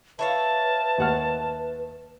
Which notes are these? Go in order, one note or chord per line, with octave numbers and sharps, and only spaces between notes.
E4 B4 C#5 F5 A5
D#2 F#5 F6